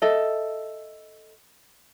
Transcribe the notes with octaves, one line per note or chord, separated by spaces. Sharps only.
A4 D#5 E5